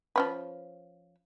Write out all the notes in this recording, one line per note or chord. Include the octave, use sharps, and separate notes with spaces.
F3 C#4 B4